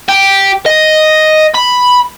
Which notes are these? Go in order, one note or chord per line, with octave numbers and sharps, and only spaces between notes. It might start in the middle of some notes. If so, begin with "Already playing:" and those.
G4
D#5
B5